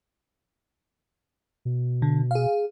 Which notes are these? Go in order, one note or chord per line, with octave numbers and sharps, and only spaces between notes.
B2
D3
G#4 F5